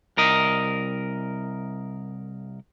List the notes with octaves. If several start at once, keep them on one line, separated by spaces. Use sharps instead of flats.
C2 A#4 D#5